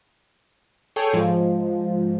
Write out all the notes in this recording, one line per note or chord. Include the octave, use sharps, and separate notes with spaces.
G#4 A4 C#5 G5
G#2 F3 G#3